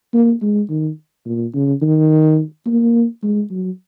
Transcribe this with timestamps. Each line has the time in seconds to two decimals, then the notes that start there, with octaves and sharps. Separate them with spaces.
0.13 A#3
0.42 G#3
0.69 D#3
1.26 A#2
1.54 C#3
1.82 D#3
2.66 A#3
3.22 G#3
3.50 F#3